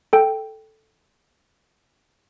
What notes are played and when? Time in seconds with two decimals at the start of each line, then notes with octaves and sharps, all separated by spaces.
0.13 A4 G5